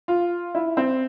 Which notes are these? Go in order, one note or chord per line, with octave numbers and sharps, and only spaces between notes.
F4
E4
C4